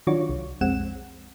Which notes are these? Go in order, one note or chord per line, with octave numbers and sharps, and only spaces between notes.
D#3 F#3 D4 F4 F#4 C#5
C2
B1 F2 G#3 C4 F#5 E7